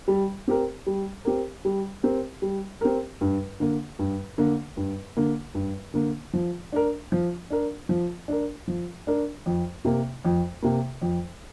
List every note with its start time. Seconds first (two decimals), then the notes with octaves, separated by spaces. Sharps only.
0.08 G3
0.48 C4 G4 A#4
0.87 G3
1.25 C4 G4 A#4
1.65 G3
2.03 C4 G4 A#4
2.42 G3
2.81 C4 G4 A#4
3.21 G2
3.60 D3 A#3
3.99 G2
4.38 D3 A#3
4.77 G2
5.17 D3 A#3
5.55 G2
5.94 D3 A#3
6.34 F3
6.72 D4 A#4
7.12 F3
7.50 D4 A#4
7.89 F3
8.28 D4 A#4
8.68 F3
9.07 D4 A#4
9.46 F2
9.85 C3 A#3
10.25 F2
10.62 C3 A#3
11.02 F2